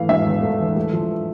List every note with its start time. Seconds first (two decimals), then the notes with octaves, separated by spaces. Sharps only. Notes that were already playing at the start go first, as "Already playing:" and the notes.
Already playing: E3 A3 F5
0.09 E1 E5
0.26 E2
0.43 A3
0.60 E3
0.76 A3
0.93 F3